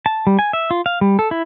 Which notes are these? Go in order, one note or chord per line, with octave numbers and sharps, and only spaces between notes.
A5
G3
G#5
E5
F4
F5
G3
A4
E4